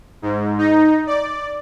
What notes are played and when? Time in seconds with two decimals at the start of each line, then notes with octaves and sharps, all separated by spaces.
0.22 G#2
0.58 D#4
1.07 D5